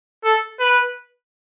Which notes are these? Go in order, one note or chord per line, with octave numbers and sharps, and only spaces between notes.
A4
B4